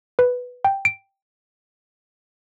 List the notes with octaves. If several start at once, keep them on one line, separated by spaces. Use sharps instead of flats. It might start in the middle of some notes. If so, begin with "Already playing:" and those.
B4
G5
D7